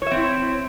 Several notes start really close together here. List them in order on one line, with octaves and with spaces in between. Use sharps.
C#5 E5 C4 E4